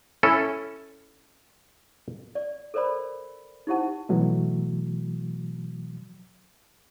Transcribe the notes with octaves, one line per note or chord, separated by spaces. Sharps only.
C#4 E4 A4
D5
A4 A#4 C5 D5 B5
D#4 E4 G4 C5 F#5 A5
B2 E3 F#3 A3